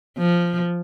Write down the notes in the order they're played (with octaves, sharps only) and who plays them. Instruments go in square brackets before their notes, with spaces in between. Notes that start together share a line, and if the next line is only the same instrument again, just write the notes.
[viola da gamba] F3